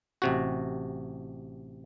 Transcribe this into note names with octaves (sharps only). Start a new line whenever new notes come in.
A1 C3 F#4